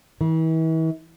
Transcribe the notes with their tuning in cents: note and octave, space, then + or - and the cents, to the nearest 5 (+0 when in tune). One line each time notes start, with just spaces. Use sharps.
E3 -40